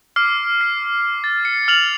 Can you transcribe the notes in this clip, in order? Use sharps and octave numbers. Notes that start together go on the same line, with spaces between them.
D6 F6 C7
C7
A6
C#7
F6 F7 F#7